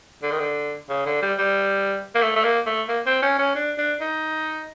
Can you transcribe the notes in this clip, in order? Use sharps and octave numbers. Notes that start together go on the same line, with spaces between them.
D3
D#3
D3
C#3
D3
G3
G3
A#3
A3
A3
A#3
A3
A#3
C4
C#4
C#4
D4
D4
D#4